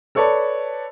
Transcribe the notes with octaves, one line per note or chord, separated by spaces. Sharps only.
A4 B4 C#5 D5 A5 B5